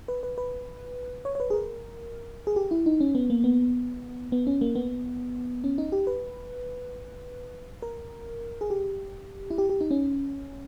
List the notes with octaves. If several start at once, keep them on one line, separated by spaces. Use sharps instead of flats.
B4
B4
B4
C#5
C#5
B4
G#4
A#4
G#4
G4
E4
D#4
C#4
B3
A#3
B3
B3
C#4
A#3
B3
C#4
D#4
G4
B4
A#4
G#4
G4
E4
G4
G4
D#4
C#4